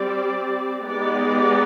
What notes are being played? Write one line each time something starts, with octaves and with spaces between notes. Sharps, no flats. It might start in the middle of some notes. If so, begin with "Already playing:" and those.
Already playing: G3 C4 G4 D5
G#3 B3 D#4 G4 D5